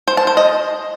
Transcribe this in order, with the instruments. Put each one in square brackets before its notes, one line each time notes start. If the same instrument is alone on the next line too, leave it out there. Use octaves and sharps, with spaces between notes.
[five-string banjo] C5
A5
C5
D#5